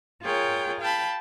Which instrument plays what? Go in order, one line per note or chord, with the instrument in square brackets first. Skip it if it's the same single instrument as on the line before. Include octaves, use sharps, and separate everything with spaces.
[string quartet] F4 G#4 A#4 C#5 G5
F5 G5 A5 B5